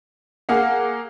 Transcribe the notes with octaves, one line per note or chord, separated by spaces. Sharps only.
A#3 G#4 F5 F#5